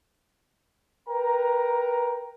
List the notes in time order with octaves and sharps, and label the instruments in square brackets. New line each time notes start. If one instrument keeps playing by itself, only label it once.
[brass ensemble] A#4 B4 G5 A#5